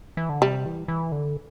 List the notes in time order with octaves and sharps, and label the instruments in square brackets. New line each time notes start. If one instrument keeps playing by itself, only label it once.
[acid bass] E3
D3
[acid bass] C3 [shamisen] G3
[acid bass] E3
E3
D3